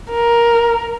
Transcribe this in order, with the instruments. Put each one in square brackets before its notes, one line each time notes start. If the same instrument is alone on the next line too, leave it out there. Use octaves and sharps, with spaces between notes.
[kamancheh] A#4